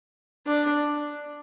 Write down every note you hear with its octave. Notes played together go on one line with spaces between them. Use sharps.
D4